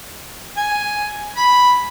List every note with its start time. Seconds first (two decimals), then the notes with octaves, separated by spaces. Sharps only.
0.57 G#5
1.36 B5